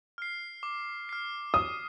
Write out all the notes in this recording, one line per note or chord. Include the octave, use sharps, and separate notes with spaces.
F6 C7
D6
F6 C7
D6 D#6